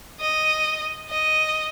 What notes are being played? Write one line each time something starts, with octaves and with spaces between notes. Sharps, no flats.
D#5
D#5